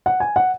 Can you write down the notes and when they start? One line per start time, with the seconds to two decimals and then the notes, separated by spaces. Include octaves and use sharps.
0.06 F#5
0.20 G#5
0.36 F#5